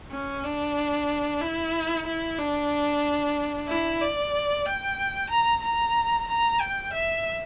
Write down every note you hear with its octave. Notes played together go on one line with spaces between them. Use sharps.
C#4
D4
E4
E4
D4
E4
D5
G5
A#5
A#5
A#5
G5
E5